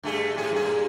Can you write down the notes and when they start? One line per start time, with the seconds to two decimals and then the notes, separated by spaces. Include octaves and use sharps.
0.03 G2 A3 G#4
0.35 A2 G#4
0.52 G2 A#2 G#4